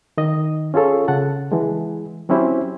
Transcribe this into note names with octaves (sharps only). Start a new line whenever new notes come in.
D#3 D#5
C#4 F4 G#4 A4 C#5
C#3 F#5 A5
E3 G#3
F#3 C4 C#4 E4 G4 C5